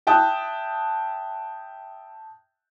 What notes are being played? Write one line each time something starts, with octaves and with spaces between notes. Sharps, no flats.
E5 G5 A5 D#6 F#6